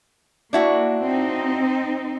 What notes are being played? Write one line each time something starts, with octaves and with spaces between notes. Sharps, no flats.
A#3 D4 E4 F#4
C4 D#4